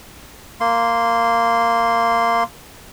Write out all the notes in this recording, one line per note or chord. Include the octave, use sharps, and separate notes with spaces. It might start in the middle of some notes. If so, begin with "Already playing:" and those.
A#3 C6